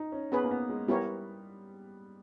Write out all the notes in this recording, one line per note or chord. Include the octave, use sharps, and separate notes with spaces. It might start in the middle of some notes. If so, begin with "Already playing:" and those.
Already playing: D#4
C#4
B3 C#4 G#4 B4
A#3
B3
G#3
G3 B3 E4 G4 A#4 C#5